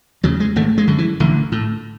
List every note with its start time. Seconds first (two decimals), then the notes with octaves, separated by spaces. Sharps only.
0.23 E2 C#3 F#3
0.40 G#3
0.56 G#1 A3
0.78 G#3
0.88 F#2 D3
0.98 E3
1.20 A1 D3
1.52 A2